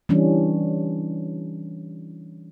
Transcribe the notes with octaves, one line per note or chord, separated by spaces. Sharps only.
E3 G3 C#4 D4